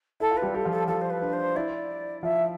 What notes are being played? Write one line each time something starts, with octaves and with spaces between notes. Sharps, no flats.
E4 A4
F4
B4
G3 G4
G4 A4
F3 F4
A4
F3 F4 A4
C5
B4
D4
C5
E4 D5
F3 F4 E5